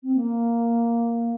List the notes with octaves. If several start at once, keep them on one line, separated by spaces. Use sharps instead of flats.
C4
A#3